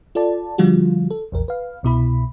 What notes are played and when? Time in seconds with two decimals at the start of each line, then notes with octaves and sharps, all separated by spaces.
0.15 F4 A4 D5 A5
0.58 D3 F3 G3 F4 F#4
1.11 A4
1.32 A#1 E2 A#4
1.48 B4 F5
1.83 C2 B2 E4 B5